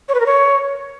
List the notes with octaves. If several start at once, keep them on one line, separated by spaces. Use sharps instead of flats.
C#5
B4
A#4
C#5